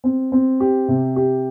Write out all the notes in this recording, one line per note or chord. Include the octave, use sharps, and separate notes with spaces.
C4
C4
G4
C3
G4